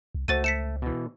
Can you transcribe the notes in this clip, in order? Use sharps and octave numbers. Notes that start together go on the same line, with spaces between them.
C2
C#2 A3 F#4 C5 A6 D#7
A3 B6 C#7 E7
B2 E3